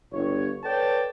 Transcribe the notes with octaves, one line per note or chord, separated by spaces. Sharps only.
G1 C#5
A4 B4 C#5 D5 G5 A5